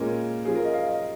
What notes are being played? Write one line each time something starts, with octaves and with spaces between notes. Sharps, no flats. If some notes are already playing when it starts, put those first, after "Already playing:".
Already playing: A#2 G#3 C#4 A#4
F3 C#4 F4 G#4
A#4
D#5
F5
D#5